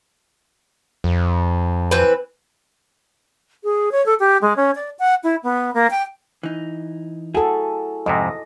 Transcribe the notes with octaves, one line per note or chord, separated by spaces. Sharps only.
F2
E3 C4 B4
G#4
C#5
A4
G4
G#3
C#4
D5
F#5
E4
B3
A#3
G5
E3 D#4
E4 F#4 G#4 A4
F2 G#2 C3 D#5